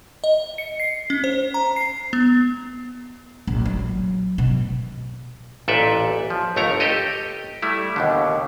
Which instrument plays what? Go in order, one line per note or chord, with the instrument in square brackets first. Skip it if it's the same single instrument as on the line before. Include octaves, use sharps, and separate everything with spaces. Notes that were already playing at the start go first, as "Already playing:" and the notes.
[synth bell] D#5
C#7
C7
C#4
C5
A#5
C7
B3
[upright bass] A#1
F#3
B2
[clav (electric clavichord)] A1 A#2 A4 B4 D5 E5
F3
G1 C#2 A3 A#4 C#5 A#5
G4 A4 D#5 G5
G3 A3 E4
D#2 B2 D3